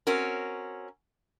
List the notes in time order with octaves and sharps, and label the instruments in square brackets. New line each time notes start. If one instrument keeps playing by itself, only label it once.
[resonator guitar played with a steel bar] C4 C#4 F#4 A#4